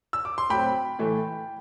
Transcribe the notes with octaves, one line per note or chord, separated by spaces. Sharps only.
E6
D6
C6
A2 F#3 C4 G5 B5
A2 E3 A3